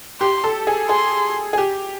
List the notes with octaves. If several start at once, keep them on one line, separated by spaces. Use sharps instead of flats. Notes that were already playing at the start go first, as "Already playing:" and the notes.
G4 C6
A4
G#4
G#4 C6
G#4
G4